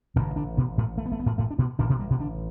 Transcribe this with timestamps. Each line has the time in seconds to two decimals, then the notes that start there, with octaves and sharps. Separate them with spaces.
0.16 A1 G2 B2 D3 B3
0.36 D3 D4
0.57 B2 B3
0.78 A2 A3
0.98 A3
1.06 B3
1.12 A3
1.19 B3
1.26 A2 A3
1.38 A2 A3
1.51 D4
1.59 B2 B3
1.79 A1 A2 D3 D4
1.90 B2 B3
1.99 G2 G3
2.10 B2 B3
2.19 D3 D4